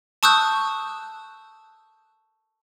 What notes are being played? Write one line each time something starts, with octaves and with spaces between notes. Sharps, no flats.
A5 C#6 D#6 E6 F#6 G6